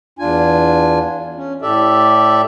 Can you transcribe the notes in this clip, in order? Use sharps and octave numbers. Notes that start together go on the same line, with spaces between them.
E2 D4 F4 G#5
C#4
A2 G4 A4 D5 E5